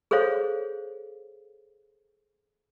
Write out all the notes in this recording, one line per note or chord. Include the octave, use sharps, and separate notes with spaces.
G#4 A4 C5 C#5 F5